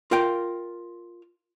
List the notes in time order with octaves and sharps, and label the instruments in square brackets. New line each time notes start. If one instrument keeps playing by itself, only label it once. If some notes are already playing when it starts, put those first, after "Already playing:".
[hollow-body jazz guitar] F4 A#4 F5 G5